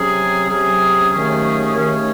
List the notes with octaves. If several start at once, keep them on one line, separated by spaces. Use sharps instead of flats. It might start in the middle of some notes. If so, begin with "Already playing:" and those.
Already playing: C3 F#3 C#4 G#4
C3 F#3 C#4 G#4
D#2 D#3 A3 C#4 G#4
D#2 D#3 A3 C#4 G#4